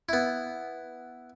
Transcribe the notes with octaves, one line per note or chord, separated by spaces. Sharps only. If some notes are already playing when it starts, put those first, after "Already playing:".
B3 E4